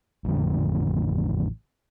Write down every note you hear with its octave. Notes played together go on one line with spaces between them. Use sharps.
A1 F2 D3